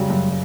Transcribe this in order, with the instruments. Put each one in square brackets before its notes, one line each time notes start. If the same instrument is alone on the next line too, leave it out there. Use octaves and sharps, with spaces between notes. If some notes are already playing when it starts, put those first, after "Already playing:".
Already playing: [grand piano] F#2 C#3 F#3 [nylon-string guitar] G3
[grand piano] F#2